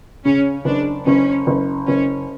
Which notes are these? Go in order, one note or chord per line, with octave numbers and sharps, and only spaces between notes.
C#3 C#4
F#1 D4
F#1 C#4
F#1
F#1 C#4